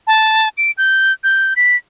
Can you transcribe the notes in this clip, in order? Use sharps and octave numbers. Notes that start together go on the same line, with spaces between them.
A5
D7
G6
G6
B6